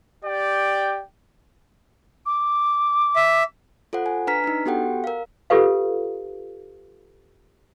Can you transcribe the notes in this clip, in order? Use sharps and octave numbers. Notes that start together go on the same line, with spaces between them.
G4 D5 G5
D6
E5
F4 A4 C5 F#5
G#5
D4 B4 A#5 F6 B6
D4 D#4
B3 F#4 G4 A4 F#5 G5
A#4 F5
F4 G4 A4 B4 F5